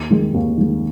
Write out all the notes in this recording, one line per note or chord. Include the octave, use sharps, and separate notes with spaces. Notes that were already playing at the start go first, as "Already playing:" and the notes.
Already playing: D#2
D#3 G#3
D#2
D#3 G#3